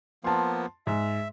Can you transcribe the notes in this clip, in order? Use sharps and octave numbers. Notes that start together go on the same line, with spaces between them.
F3 A#3 B3 A5 C6
G#2 E5